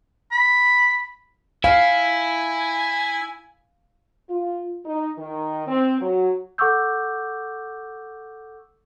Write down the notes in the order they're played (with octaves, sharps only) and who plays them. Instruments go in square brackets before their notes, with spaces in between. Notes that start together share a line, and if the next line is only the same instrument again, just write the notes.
[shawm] B5
[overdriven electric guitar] E4 [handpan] F5 [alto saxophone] G#5
[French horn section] F4
D#4
D#3
C4
F#3
[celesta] A4 F#5 C#6 D6 E6 G6